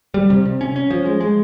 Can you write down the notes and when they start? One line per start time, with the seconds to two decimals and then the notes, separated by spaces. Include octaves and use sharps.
0.14 G3
0.30 C3
0.45 C3
0.61 C#4
0.76 C#4
0.90 F3
1.05 G#3
1.21 G#3